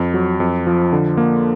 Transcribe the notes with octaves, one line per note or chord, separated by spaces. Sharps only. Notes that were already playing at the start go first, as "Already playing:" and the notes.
Already playing: F2
F#3
F2
F3
D3
A#3